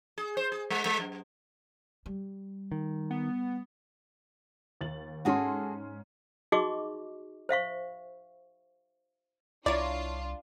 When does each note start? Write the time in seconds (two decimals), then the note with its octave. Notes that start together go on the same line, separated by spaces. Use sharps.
0.18 G#4
0.37 C5
0.52 G#4
0.70 G#3
0.86 G#3
1.00 F#2
2.06 G3
2.72 D#3
3.11 B3
4.81 D#2 A6 F#7
5.25 G#2 C#4 F#4 G#4 A4 C6
6.52 D#4 F#4 G#4 D#5 C#6 D6
7.49 C5 E5 F5 C#6
9.66 C2 D4 E4 F4 C#5 D5 A#5